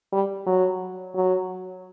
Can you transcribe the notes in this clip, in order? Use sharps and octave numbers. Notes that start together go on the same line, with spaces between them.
G3
F#3
F#3